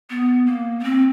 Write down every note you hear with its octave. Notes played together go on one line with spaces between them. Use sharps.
B3
A#3
B3
C4